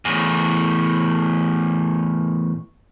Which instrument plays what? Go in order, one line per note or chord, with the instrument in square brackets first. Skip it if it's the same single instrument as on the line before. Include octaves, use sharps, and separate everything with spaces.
[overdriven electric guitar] E2 A2